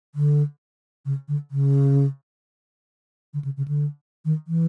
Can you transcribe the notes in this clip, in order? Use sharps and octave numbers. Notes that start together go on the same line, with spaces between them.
D3
C#3
D3
C#3
D3
C#3
C#3
D3
D#3
E3